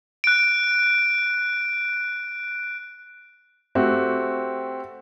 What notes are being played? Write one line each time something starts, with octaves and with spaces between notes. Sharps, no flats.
F#6 D7
A3 C4 F#4 G4